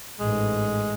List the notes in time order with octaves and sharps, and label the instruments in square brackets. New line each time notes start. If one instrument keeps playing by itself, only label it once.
[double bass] A1 G#2 [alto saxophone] G#3